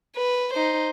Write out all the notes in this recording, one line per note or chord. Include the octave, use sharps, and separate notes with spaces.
B4
D#4 C5